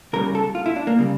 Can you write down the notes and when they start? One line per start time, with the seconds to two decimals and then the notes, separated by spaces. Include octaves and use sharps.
0.13 C#2 C#3 G3 A#4
0.35 A4
0.55 F4
0.66 E4
0.76 D4
0.87 A#3
0.99 C#3 G3